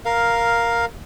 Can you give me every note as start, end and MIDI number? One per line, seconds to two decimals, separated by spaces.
0.05 0.85 70
0.05 0.85 77